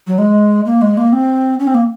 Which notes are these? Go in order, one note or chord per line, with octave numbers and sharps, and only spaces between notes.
F#3
G#3
A#3
G#3
A#3
C4
C#4
C4
A#3